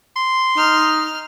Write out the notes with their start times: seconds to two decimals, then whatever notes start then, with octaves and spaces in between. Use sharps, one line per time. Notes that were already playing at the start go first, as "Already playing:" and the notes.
0.16 C6
0.57 D#4 F6